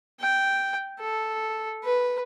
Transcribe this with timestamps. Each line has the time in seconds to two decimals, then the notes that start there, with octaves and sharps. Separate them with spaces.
0.20 G5
1.00 A4
1.84 B4